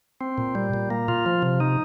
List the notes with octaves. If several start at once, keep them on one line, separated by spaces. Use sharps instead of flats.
C4
A#2
G3
A#2
A#3
F4
F3
C3
D#4